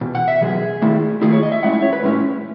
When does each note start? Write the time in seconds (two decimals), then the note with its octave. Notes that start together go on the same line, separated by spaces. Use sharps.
0.01 E2 B2
0.15 F#5
0.28 E5
0.41 E2 B2 F#3 G#4
0.82 D#3 A3 E4
1.22 D#3 A3 E4 G#4
1.32 C#5
1.43 D#5
1.52 E5
1.63 A2 G#3 C#4 E4 F#5
1.73 E5
1.82 C#5
1.93 B4
2.03 A2 G#3 C#4 E4